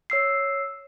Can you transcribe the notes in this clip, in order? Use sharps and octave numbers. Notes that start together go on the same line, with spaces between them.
C#5 E6 C7